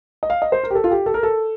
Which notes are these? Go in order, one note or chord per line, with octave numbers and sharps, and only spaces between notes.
D#5
F5
D#5
C5
A#4
G4
A4
F4
G4
A4
A#4
A4